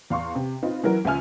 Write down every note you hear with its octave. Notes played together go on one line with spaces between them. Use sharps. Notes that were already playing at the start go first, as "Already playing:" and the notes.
E2 F5 C6 C#6
C3
C4 D#4 F4 B4
E3 F#3 E4 F#4 A#4
C#2 F3 E5 G#5 F6